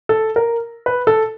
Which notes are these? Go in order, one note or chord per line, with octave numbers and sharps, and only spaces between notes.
A4
A#4
B4
A4